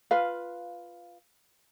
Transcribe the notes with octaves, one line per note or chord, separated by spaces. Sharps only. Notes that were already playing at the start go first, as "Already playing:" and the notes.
F4 B4 F5